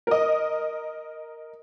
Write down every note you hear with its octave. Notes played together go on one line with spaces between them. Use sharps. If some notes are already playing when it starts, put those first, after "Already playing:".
A#4 D#5